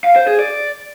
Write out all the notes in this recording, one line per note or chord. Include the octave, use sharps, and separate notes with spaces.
F5
C5
G#4
D5